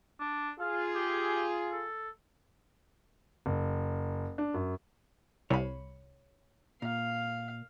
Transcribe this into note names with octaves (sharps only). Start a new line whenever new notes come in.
D4
F4 G#4 F5
G4
A4
F#1
D4
F#2
C2 C#5 B5
A#2 F5